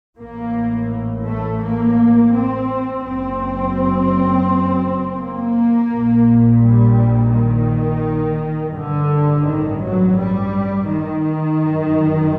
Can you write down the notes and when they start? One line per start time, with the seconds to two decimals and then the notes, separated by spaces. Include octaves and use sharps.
0.19 A1 A2 A#3
1.26 A3
1.61 A#3
2.32 C4
3.04 F#1 F#2 C4
5.17 A#3
5.89 A#1 A#2
6.60 G3
7.31 D#3
8.74 A1 G2 D3
9.44 D#3
9.80 F#3
10.16 G3
10.87 D#3
11.58 G1 F#2